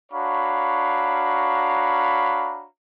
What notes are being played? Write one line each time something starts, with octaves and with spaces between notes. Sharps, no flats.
D4 F#4 C#5 F5 A#5 B5